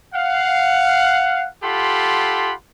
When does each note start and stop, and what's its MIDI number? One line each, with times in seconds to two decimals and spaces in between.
0.14 1.47 77
0.14 1.47 78
1.63 2.53 65
1.63 2.53 67
1.63 2.53 69
1.63 2.53 78
1.63 2.53 83
1.63 2.53 84